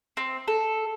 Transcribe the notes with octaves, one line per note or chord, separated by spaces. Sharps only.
C4
A4